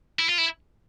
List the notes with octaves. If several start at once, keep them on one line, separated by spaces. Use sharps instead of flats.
E4
F4
E4